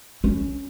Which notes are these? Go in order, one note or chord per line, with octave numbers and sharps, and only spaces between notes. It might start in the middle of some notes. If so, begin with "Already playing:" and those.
C#4